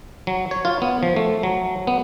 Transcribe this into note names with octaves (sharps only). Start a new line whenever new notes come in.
F#3
C#5
F4
B3
F3
A3
F#3
B3